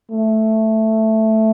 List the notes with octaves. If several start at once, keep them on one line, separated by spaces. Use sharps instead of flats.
A3